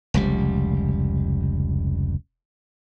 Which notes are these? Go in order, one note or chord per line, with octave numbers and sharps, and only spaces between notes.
F1 C#2 G3